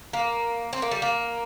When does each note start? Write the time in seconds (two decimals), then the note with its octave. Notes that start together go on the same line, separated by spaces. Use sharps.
0.13 A#3
0.73 C4
0.82 A#3
0.91 G3
1.02 A#3